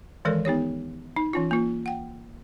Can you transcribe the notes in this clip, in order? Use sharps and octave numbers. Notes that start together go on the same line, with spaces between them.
D#3 E3 G#3 A4 A#4 D5
B3 D#4 G4 C#5
D#4
E3 C#4 F4
A#3 F4
F#5 G5